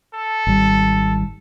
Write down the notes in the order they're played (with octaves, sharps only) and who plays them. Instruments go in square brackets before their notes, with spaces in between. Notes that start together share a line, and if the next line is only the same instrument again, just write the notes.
[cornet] A4
[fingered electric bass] G#1 G3